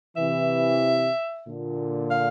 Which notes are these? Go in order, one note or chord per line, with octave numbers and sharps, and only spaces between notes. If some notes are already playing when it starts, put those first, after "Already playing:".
C3 E3 E5
A#2 D3
F5